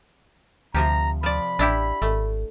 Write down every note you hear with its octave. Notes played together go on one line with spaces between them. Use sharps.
D2 C3 F3 G4 A#5
F3 D5 B5
A1 D4 E4 G4
G#1 A3